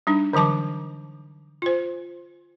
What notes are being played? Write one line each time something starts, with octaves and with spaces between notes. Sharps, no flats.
G3 D4 D#4
D3 E3 F#3 A5 D6
F4 C5